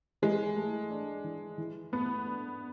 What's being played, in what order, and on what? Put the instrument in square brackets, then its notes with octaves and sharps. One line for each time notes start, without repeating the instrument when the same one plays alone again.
[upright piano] E3 [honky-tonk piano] G#3
[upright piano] A3
D4
E3
E3
[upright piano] A3 [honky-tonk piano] B3
[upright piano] D4